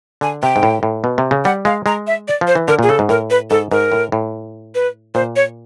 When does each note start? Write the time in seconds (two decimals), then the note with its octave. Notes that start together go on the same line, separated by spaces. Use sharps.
0.21 D3 G#5
0.43 C3 G5
0.56 G#2
0.63 A2
0.83 A2
1.04 B2
1.18 C3
1.31 C#3
1.45 G3 F#5
1.65 G#3 F5
1.86 G#3 A#5
2.07 E5
2.28 D5
2.41 F3
2.47 C5
2.55 E3
2.68 D3 A#4
2.79 A#2 G#4
2.89 C#3 A4
2.99 G#2
3.09 A2 A#4
3.30 B4
3.50 G#2 A4
3.72 G#2 A#4
3.92 A2
4.12 A2
4.75 B4
5.15 A#2 C5
5.36 C#5